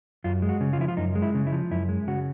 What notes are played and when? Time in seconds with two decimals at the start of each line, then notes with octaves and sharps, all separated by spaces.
0.24 F#2 F4
0.42 G#3
0.49 F#4
0.61 C#3
0.73 F4
0.79 F3 E4
0.88 F4
0.97 F#2 D#4
1.15 G#3
1.22 E4
1.35 C#3
1.47 E4
1.52 F3
1.71 F#2 E4
1.89 G#3
2.08 C#3 F#4